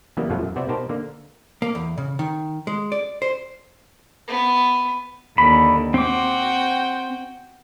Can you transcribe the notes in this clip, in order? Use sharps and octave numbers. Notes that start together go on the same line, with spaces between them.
C#3 E3 F#3 G3 A#3 B3
F#2 B2 F3 F#3 A3 F4
F#2
C3 B3 C4 F#4 D5 E5
B2 D#4 G4 A#4 C5 A5
D3 A#3
A#3
E2
C#3
D#3
G#3
D5
C5
B3
D#2 D3 B5
C4 F#4 G5 D6